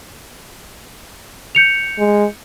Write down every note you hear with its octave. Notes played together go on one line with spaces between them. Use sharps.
G6 C#7 F7
G#3